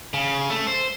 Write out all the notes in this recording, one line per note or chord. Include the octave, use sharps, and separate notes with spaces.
C#3
A3
C5